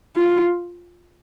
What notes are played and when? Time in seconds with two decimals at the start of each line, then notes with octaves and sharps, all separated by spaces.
0.16 F4